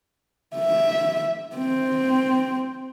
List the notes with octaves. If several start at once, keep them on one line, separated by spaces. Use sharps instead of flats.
E5
C4